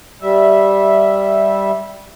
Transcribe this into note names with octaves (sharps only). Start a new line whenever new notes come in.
G3 E5